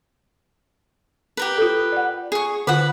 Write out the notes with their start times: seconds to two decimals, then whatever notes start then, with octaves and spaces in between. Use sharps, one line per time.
1.37 G4 A#4 B4
1.58 F4 A4
1.92 D5 F#5
2.32 G#4 C#6
2.67 D3 F4 B4 F#5